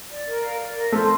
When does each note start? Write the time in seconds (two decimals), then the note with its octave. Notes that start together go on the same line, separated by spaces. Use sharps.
0.10 D5
0.26 A#4
0.42 F5
0.59 D5
0.75 A#4
0.92 A3 C5